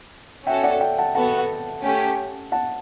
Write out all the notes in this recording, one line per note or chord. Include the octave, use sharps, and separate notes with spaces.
C#4 F#4 A4 E5 G5
D5 F#5
E5 G5
F#5 A5
B3 F#4 A4 F#5 A5
A3 C#4 G4
F#5 A5